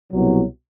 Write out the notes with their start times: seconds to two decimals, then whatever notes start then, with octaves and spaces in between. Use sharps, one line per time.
0.11 C2 B2 F#3